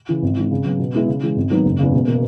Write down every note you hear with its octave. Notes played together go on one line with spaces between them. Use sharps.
C#3 E3
G#1
G#2 E3
C#3
F#3 B3
B2
G#3 B3 E4 G#4
C#3
E3 G#3
G#1
G#2 D#3 F#3 B3
F#1
E2 C#3
E1
B2 A#3